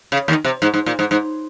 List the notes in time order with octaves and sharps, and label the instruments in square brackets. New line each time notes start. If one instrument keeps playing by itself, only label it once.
[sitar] C#3
D#2 D#3
C3
G#2
G#2
A#2
G#2
G#2